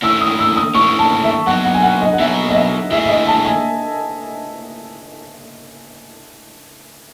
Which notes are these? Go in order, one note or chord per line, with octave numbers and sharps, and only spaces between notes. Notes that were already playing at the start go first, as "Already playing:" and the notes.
D#3 A3 C#4 E4 E6
D#6
E6
D#6
D#3 A3 C#4 E4 C#6
A5
E5
F#3 B3 D#4 F#5
F#5
G#5
F#5
D#5
F#5
F#3 B3 D#4 E5
D#5
E5
D#3 A3 E4 G#4 E5
E5
D#5
A5
G#5